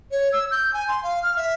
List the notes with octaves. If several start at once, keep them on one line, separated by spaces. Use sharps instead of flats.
C#5
E6
G6
G#5
C6
F5
F6
E5